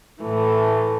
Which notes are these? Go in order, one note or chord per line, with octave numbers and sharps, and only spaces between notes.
A2 E3 A3